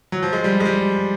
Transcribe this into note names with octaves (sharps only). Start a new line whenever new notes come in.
F#3
F3
G#3
G3
G#3
G3